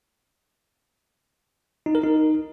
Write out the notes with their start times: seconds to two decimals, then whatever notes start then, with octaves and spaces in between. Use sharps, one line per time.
1.86 D#4
1.95 A#4
2.03 D#4